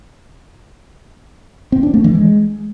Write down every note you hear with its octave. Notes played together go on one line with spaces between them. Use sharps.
C4
D4
A3
E3
G#3